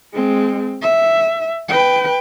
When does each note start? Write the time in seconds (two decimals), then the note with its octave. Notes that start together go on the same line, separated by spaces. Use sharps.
0.14 G#3 C4
0.82 E5
1.69 B4 G5